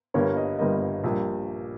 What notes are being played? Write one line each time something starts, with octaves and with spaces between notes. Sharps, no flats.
G1 G2 G3 A#3 C#5
D#5
G1 G2 G3 A#3 D#5
A#1 A#2 G3 A#3